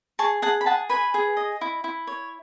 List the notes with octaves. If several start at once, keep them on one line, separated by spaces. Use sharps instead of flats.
G#4 A5 C#6
G#4 F#5 A5
B5
G#4 F#5 A5
B4 G#5 B5
G#4
D#5
E4
E4
C#5